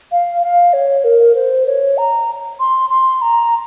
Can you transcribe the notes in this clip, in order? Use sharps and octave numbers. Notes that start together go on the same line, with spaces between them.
F5
F5
C#5
A#4
C5
C#5
A#5
C6
C6
A#5